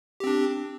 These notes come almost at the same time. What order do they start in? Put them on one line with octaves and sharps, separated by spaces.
G4 C4 D4